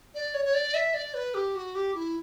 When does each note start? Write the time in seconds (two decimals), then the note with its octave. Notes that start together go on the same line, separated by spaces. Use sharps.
0.15 D5
0.34 C#5
0.45 C#5
0.54 D5
0.74 E5
0.94 D5
1.14 B4
1.34 G4
1.55 F#4
1.75 G4
1.95 E4